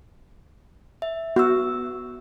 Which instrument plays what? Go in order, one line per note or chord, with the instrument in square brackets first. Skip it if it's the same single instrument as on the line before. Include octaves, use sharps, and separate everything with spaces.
[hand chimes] E5
[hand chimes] B3 E6 [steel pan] F#4